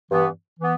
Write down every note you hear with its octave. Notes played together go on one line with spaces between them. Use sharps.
G2 E3 B3
E3 B3